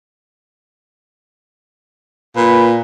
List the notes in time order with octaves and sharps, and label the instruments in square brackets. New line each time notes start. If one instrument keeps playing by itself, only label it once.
[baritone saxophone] A#2 [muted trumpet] B4